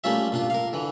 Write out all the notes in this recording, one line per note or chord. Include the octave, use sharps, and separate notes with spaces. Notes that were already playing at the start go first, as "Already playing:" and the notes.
G3 A3 A#3 C#4 F4 E5
A#2 D4 F4
A#4 F5
D3 E3